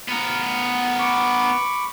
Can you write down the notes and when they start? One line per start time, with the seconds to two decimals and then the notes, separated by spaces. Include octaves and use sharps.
0.08 B3 A#4
0.99 B5 C#6 D6